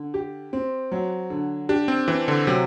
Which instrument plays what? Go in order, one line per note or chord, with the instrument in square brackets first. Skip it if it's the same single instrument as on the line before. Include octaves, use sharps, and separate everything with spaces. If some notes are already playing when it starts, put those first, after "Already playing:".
Already playing: [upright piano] D3
G4
C4
F#3
D3
[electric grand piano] D4 [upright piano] G4
[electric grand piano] C4
[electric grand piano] E3 [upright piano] C4
[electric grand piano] D3
[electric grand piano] C3 [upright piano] F#3